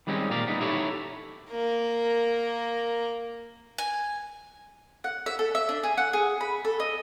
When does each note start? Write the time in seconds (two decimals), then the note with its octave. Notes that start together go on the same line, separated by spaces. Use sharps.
0.07 D#3 G3 G#3 C4 C#4
0.30 A#2 G3 A#4 D5
0.47 G3 B3 D#4
0.60 D#4 E4 G4 A4 C#5
1.50 A#3 A#4
3.78 G#5
5.04 F#5
5.26 E5
5.39 A4
5.55 E5
5.69 D4
5.83 G#4
5.98 F#5
6.13 G#4
6.41 B5
6.65 A4
6.80 D#5